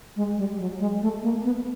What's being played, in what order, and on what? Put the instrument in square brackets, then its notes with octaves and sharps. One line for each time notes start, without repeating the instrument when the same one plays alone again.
[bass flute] G#3
G3
F#3
G#3
A3
A#3
B3